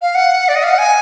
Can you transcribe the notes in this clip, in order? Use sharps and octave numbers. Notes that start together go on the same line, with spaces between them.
F5
F#5
D5
D#5
F5
F#5
G#5